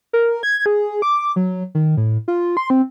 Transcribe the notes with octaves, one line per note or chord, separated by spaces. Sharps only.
A#4
G#6
G#4
D6
F#3
D#3
A2
F4
C6
C4